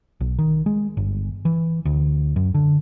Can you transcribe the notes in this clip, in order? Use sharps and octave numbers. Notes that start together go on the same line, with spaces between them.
B1
D#3
G#3
G1
E3
D2
F#2
D3